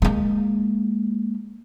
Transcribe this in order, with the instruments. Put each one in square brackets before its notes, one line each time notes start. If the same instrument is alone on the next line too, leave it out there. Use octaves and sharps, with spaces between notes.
[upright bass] G#3 A#3